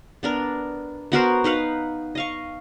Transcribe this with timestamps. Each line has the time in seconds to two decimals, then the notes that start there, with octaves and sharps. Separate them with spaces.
0.23 B3 D4 A#4
1.12 B3 F#4 A#4 C5
1.44 D#4 B4 F5 F#5
2.15 D#5 F5 C#6